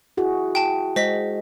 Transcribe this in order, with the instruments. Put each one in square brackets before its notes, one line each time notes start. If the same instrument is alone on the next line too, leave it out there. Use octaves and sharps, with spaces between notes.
[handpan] E4 F#4 G#4
[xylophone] G5 A5
[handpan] G#3 [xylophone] C5 D#5 B6